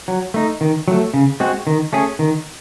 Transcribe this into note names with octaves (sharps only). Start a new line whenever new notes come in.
F#3
A3 D#4
D#3
F#3 A3
C#3
G#3 C4 F#4
D#3
A3 C#4 G#4
D#3